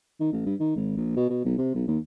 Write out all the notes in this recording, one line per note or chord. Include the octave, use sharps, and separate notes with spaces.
D#3
A1
G2
D#3
G#1
A#1
B2
B2
B1
C3
B1
D#2